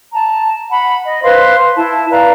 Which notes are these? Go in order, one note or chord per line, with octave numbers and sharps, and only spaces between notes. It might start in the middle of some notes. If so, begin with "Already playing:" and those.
A5 A#5
F#5 B5
D#5
B4 C5 F5 C6
E4 A5
B4 D5 F5 A#5